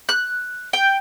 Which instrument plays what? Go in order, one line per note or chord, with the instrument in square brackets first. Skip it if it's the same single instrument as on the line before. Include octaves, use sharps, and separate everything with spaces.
[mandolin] F#6
G5